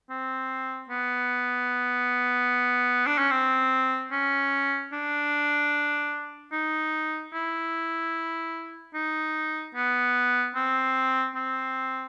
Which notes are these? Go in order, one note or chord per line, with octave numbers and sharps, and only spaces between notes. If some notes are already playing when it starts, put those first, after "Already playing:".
C4
B3
D4
C#4
C4
C#4
D4
D#4
E4
D#4
B3
C4
C4